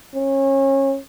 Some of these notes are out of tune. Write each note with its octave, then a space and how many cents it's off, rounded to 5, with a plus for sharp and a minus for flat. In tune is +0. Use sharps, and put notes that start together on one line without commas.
C#4 -30